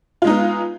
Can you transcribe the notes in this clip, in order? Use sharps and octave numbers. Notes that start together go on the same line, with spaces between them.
G#3 B3 D#4 F4